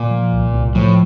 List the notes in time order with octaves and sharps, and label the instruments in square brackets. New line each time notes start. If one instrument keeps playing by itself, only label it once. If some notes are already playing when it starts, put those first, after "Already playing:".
Already playing: [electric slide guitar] A#2
[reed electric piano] F3
C2
C2
[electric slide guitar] A2 [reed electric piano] F3